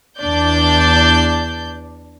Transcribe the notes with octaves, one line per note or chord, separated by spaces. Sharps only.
E2 D4 D5 G6